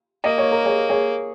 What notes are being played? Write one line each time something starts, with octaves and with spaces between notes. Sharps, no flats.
A#3 D#5
C#5
A#4
G#4 C#5
G#4 C#5